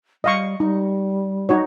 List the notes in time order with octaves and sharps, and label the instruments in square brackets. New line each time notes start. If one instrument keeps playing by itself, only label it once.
[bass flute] G3 [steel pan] D#5 F5 C#6
[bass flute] G3 [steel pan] D#4
[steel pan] D#4 F#4 C#5